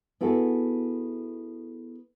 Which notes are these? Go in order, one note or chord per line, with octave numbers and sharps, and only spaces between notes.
B3 E4 F#4 G#4 A4